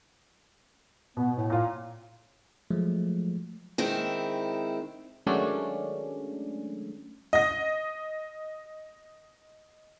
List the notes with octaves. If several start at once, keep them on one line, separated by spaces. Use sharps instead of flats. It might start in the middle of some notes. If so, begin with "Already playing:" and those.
B2 B3
A2
A#2 F4
F3 F#3 G#3 A3
D#3 G#3 C4 E4
D#3 F#3 G#3 A3 C#4 D4
D#5 A#6